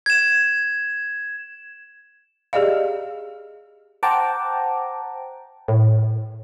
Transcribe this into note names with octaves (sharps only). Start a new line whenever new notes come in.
G#6 E7
G4 G#4 D5 D#5 F5
C5 F#5 G5 A5 A#5 D6
A2